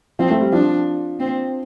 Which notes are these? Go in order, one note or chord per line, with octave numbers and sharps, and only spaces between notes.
F3 C4
A3
G3
F3 D4
C4